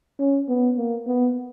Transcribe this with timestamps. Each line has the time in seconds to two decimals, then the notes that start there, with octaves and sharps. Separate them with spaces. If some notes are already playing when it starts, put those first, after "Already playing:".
0.19 C#4
0.49 B3
0.77 A#3
1.07 B3